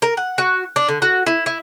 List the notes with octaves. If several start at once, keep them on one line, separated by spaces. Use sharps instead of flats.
A#4
F#5
F#4
D4
D3
F#4
E4
E4